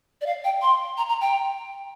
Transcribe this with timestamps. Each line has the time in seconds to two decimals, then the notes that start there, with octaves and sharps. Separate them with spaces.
0.21 D5
0.26 F5
0.44 G5
0.62 C6
0.98 A#5
1.09 A#5
1.21 G5